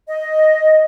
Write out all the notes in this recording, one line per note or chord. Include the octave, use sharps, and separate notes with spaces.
D#5